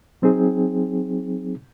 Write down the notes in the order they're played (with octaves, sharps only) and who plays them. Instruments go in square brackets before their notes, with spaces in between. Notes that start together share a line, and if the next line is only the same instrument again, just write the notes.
[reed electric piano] F#3 C4 D#4 G#4